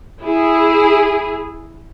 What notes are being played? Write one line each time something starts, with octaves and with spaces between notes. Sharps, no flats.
E4 G#4